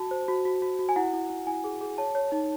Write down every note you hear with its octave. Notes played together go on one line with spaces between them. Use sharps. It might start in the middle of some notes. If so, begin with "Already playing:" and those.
Already playing: F#4 A5
C5
F#4
F#4
F#4
F#4
G#5
E4 F#5
E4
E4
E4 G#5
G#4
G#4
C#5 A5
C#5
D#4